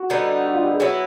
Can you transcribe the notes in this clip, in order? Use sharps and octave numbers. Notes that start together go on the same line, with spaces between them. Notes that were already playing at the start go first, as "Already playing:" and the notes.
Already playing: F#4
D3 G3 B3 D#4
F#4
F4
G4
G#4
F#3 B3 E4 F#4